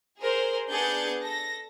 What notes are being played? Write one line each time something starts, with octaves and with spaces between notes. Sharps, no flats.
G#4 A#4 C5
B3 D4 G#4 G6 A6 C#7
A4 A#6